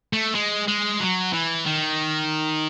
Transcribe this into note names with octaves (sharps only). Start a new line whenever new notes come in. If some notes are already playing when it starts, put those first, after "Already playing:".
A3
G#3
G#3
F#3
E3
D#3